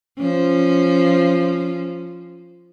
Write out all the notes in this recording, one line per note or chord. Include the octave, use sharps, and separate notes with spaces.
F3 C#4